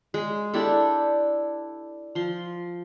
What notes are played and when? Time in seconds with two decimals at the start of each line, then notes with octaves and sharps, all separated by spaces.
0.14 G#3
0.54 D4 E4 G4 A4
2.15 F3 C6